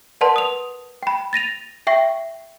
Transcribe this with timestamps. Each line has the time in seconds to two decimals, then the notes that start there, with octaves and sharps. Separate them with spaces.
0.21 A#4 B4 D5 F#5 A5 C6
0.36 D#6 F7
1.03 G5 B5
1.33 A6 A#6 D#7 F7
1.87 E5 G5 C#6 A#6